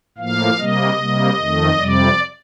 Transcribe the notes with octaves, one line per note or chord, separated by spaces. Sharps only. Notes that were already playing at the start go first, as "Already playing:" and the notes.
A2 F3 A#3 F5
C3 G3 A#3 D#5
C3 G3 A#3
F2 D#3 A3
F2 C3 G3 D5